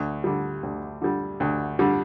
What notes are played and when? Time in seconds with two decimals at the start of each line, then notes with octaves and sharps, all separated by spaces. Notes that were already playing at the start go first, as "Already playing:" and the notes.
Already playing: D2
0.24 D3 G3
0.63 D2
1.02 D3 G3
1.40 D2
1.79 D3 G3